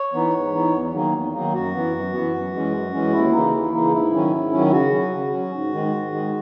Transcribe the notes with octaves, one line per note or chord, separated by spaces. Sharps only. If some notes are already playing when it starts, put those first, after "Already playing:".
Already playing: C#5
E3 B3 D#4
G#2
E3 B3 D#4
E2
D#3 F#3 A#3 D#4
E2
D#3 F#3 A#3 D#4
F#2 F#4
E3 B3
F#2
E3 B3
F#2
E3 G#3 C#4
F#2
E3 G#3 C#4
D#2 E4
C#3 E3 A#3 D#4
D#2
C#3 E3 A#3 D#4
G#2 E4
D#3 F#3 C#4
G#2
D#3 F#3 C#4
E4
C#3 F#4
F#3 C#4
C#3
F#3 C#4
G#2
D#3 G#3
G#2
D#3 G#3